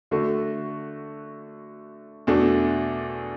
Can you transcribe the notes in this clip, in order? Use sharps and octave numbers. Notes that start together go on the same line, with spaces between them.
D3 A3 F#4
E2 B2 A3 D4